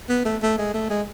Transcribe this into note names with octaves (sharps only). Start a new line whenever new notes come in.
B3
A3
A3
G#3
A3
G#3